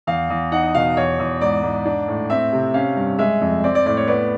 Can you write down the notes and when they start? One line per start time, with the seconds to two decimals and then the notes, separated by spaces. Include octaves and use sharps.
0.07 E2 F5
0.30 E2
0.52 D#4 F#5
0.74 B2 F5
0.97 E2 C#5
1.19 E2
1.41 G#2 D5
1.63 G#2
1.85 D4
2.08 A2
2.30 C4 E5
2.53 C3
2.74 C#4 F5
2.97 G2
3.19 G#3 E5
3.41 F2
3.64 C4 D5
3.75 D5
3.86 A2 D5
3.97 C#5
4.07 B3 D5